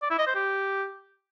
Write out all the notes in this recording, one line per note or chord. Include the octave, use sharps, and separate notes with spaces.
D5
E4
D#5
C5
G4